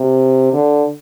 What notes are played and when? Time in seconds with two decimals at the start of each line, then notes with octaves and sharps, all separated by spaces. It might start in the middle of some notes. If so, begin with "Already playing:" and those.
Already playing: C3
0.53 D3